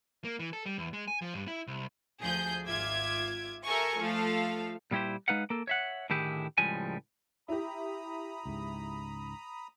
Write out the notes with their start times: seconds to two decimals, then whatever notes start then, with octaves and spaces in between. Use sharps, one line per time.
0.25 A#3
0.39 E3
0.53 A4
0.66 G3
0.78 E2
0.93 G#3
1.08 G#5
1.22 F3
1.34 G2
1.48 E4
1.67 C2
2.20 D2 F3 G#4 G6
2.66 G#1 F4 E5 D6 G#6
3.64 G4 A4 A#4 E5 G#5 C#6
3.96 F3 A3 A4 F5
4.91 A#2 G3 E4 G4 C5
5.28 G#3 D#4 B4 F5 F#5
5.50 A#3 A4
5.67 C#5 E5 F#5
6.10 A2 D3 D#3 E4 G4 G#4
6.58 C#2 A2 F3 G3 G#3 G#5
7.48 E4 G4 A#5 B5 D#6
8.46 C#2 G#2